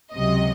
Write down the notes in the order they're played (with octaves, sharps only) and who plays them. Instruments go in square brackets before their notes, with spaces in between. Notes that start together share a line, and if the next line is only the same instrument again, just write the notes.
[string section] C#2 C3 F#3 D#5